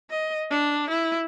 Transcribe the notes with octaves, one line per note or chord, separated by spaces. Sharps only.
D#5
D4
E4